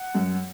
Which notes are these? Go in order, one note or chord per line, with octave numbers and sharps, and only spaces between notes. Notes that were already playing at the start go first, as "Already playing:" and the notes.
Already playing: F#5
F#2